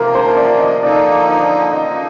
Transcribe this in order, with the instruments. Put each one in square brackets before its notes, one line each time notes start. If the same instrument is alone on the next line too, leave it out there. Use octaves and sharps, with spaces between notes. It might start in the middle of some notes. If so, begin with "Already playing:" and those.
Already playing: [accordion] C3 F3 A#3 [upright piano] A#4
[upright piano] C5
D5
D#5
[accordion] D3 F3 A#3 D#4 [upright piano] D5
[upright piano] D5
[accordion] D3 F3 A#3 D#4 [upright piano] D#5